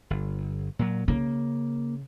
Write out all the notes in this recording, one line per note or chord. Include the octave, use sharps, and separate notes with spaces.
G1
A#2 F#3
C#3 A#3